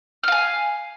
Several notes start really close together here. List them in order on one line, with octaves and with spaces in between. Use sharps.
F6 F5 G#5